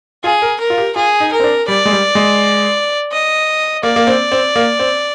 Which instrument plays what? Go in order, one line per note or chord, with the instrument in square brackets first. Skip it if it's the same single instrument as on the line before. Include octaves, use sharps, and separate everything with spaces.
[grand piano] F4 [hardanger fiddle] G#4
[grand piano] A#4
[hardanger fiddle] A#4
[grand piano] F4
G4
[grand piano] F4 [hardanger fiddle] G#4
[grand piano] D#4
[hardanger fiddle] A#4
[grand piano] C4
D4
[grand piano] G3 [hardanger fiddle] D5
[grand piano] G#3
G3
G#3
[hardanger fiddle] D#5
[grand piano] A#3 [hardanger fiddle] D5
[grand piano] A#3
C4
C4
A#3
C4